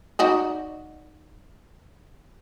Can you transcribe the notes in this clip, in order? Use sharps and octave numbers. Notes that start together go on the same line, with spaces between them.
D#4 F#4 D5